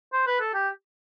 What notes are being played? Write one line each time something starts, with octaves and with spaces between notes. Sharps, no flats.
C5
B4
A4
G4